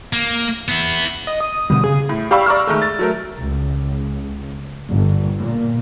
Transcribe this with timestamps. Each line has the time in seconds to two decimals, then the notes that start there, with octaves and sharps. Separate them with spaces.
0.13 A#3
0.68 B3 E4
1.27 D#5
1.40 D#6
1.70 B2 D3 G3
1.84 C#3 G#4
2.09 A2
2.31 G4 D5 F5 B5 C#6 E6
2.46 D5 A#5 C#6 E6 F6
2.67 D#3 G#3 A3
2.82 A6
2.99 F#3 A3 A#4
3.38 C#2
4.89 G1
5.39 A#2